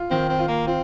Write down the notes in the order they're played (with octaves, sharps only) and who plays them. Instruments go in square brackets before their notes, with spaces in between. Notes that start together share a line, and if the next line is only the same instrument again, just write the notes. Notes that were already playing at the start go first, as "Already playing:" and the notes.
Already playing: [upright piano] F4
[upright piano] D#3 [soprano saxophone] C4
[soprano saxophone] C4
[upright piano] F4
[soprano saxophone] A#3
[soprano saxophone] C4 [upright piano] F4